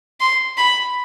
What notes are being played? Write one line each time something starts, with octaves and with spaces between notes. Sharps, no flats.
C6
B5